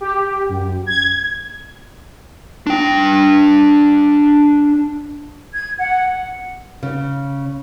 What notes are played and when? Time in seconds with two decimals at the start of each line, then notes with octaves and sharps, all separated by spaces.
0.01 G4
0.49 F#2
0.86 G#6
2.67 D4 G5
5.53 G#6
5.78 F#5
6.83 C#3